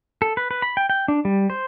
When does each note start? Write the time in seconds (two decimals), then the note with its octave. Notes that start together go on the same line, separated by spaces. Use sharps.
0.22 A4
0.37 B4
0.51 B4
0.62 B5
0.77 G5
0.90 G5
1.08 D4
1.25 G3
1.50 C5